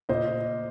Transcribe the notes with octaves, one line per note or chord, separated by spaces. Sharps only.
A#2 C5 D#5